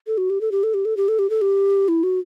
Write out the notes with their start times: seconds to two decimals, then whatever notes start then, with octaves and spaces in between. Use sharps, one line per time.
0.07 A4
0.18 F#4
0.30 G4
0.41 A4
0.52 G4
0.63 A4
0.74 G4
0.85 A4
0.97 G4
1.08 A4
1.19 G4
1.30 A4
1.41 G4
1.88 E4
2.03 F#4